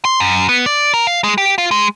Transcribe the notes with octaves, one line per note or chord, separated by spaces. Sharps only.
C6
F#2
B3
D5
A#4
F5
G#3
G4
F4
G#3